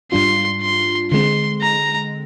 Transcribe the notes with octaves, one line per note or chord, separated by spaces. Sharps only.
G#2 G3 D4 F4 C6
C6
D3 G#3 C4 C6
A#5